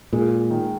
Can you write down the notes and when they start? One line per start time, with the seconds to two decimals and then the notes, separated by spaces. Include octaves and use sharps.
0.13 A#2 G#3
0.50 D#3